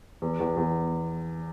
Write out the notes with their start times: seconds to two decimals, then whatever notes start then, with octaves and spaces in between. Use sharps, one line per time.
0.22 E2
0.40 E2
0.57 E2